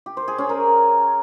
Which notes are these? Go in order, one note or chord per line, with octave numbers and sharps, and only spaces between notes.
G4
C5
G#4
C#4
A#4